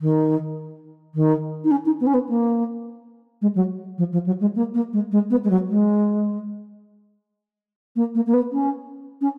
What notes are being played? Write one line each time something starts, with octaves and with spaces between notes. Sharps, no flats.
D#3
D#3
D#4
C#4
D#4
B3
C#4
B3
A#3
G#3
F#3
F3
F3
F#3
G#3
A#3
A#3
G#3
G#3
B3
G#3
F#3
G#3
A#3
A#3
A#3
B3
C#4
C#4